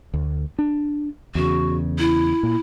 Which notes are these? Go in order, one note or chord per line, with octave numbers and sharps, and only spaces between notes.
D2
D4
E2 C#3 F#4
E4
A#2